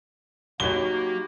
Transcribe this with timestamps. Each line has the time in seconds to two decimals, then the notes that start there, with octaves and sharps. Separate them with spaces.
0.60 F#3 A#3 D#4 G4 B4 C#5 G7